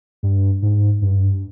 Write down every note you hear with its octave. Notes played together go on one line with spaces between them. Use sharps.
G2
G#2
G2